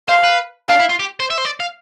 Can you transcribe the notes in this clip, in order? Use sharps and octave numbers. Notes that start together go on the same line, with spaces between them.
C5 F5
B4
D4 F5
E4
F4
G4
C5
E5
C5
D5
F5